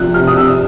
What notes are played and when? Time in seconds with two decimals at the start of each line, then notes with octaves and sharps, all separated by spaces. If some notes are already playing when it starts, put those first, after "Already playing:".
Already playing: C3 F3 F#6
0.14 C3 F6
0.27 D#6
0.37 C3 E6